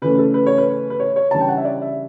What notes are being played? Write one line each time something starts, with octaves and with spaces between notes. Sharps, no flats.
C#3 E3 A3 C#4 B4
A4
B4
C#5
B4
B4
C#5
C#5
C#3 E3 G3 D4 A5
G5
F#5
E5
D5
E5